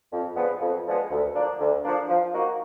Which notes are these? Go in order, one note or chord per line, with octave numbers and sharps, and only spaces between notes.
F2
D3 F3 G#3 B3
F2
D3 F3 G#3 B3
D2
D3 F3 A#3 D4
D2
D3 F3 A#3 D4
F3
A#3 D#4 F#4